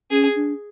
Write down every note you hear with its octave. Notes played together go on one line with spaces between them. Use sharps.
C#4 G#4
D4